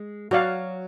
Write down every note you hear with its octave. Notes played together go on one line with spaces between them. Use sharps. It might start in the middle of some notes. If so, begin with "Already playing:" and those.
Already playing: G#3
F#3 F#4 D5 F5